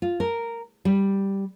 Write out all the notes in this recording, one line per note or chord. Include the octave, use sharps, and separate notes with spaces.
F4
A#4
G3